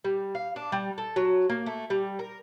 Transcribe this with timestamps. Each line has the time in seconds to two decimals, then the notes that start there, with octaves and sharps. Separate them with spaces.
0.05 G3
0.35 F5
0.56 D4
0.72 G3
0.98 A4
1.16 F#3
1.49 A#3
1.66 A3
1.90 G3
2.19 A#4